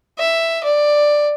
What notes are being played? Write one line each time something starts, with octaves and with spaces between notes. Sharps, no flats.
E5
D5